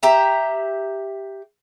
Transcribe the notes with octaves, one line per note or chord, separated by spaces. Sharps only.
G4 E5 A#5